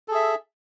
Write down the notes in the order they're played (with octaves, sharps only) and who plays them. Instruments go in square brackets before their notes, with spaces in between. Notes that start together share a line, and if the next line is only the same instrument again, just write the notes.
[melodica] A4
G#4
E5